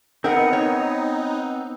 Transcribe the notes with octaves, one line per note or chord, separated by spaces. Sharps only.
B3 C4 D#4 A#4 F#5
C#5